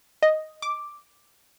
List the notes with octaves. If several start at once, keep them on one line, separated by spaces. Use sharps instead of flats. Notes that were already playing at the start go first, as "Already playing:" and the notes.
D#5
D6